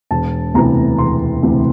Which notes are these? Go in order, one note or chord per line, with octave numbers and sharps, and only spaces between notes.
E1 A5
D2 C3 E3 A#5
E1 C6
D2 C3 E3